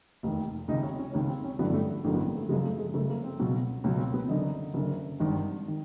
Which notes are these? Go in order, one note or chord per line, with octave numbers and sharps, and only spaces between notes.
F1 D#2 D#3
C#2 C3 D#3 D#4
C#4
C#4
C#2 C3 D#3 C#4
C4
C#4
A1 G2 D3 F#3 B3
A3
A3
A1 G2 D3 F#3 A#3
B3
A#3
A3
F#1 F#2 C#3 F3 G#3
A3
G#3
F#1 F#2 C#3 F3 A3
A#3
C4
C#2 B2 F#3
C#2 B2 F#3 C#4
C4
A#3
B3
F#1 F#2 D3 D#4
F#1 F#2 D3
G#1 G2 D#3
D#3